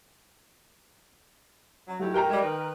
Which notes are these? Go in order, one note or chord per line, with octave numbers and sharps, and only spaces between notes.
F#3
G#2 F#3 A3 E4 G4
A#4 G5 A#5
G3 G#3
D#3 B4